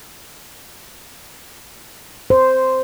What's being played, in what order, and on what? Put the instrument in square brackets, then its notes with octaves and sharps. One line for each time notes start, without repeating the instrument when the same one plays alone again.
[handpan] C5